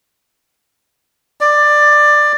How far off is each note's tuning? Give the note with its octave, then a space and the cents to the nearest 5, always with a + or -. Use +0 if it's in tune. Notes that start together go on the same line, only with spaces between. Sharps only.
D5 +15